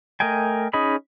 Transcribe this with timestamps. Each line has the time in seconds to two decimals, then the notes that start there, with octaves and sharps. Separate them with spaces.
0.20 A3 A#4 D#5 G5 G#5
0.73 C#4 D#4 G#4 D#5 B5